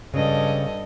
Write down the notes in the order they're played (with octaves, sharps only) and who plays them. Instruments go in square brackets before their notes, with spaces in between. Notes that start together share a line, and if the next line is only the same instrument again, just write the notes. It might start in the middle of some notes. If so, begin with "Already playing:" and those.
[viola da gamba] G2 A4 D#5 [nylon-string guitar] C#3